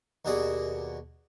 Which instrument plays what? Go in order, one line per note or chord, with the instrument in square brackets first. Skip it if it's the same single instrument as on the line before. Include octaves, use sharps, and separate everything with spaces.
[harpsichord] D#2 B2 F#4 G#4 D5